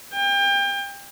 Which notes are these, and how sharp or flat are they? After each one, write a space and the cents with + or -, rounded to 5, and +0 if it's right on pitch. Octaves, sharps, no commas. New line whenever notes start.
G5 +30